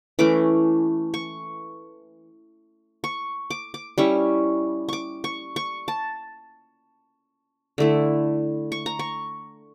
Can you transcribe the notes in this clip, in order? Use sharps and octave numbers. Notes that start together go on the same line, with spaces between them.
E3 A3 C#4 D6
C#6
C#6
D6
D6
G3 C#4 E4 C#6
C#6 D6
C#6
C#6
A5
D3 A3 E4
C#6
A#5
C#6